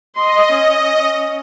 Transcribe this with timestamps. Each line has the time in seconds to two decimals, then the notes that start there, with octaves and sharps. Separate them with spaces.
0.15 D#5 C6
0.52 C#4